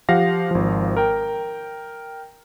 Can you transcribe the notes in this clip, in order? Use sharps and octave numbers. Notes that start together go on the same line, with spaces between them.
F3 G4 F5 F#5 A#6
G#1 F3
A#4 G5